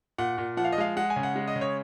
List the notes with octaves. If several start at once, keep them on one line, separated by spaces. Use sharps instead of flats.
A#2 F#5
A#2
F3 F#5
F5
D#5
G#3 F5
G#3 F#5
G#5
C#3
F#5
G#3
D#5
C#3
C#5